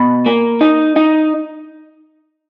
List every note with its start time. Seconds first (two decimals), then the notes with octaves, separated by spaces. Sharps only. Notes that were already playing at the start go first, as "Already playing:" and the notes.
Already playing: B2 B5
0.26 A#3
0.61 D#4
0.96 D#4